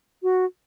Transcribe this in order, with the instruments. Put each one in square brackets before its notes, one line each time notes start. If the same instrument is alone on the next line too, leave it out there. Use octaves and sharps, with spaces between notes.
[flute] F#4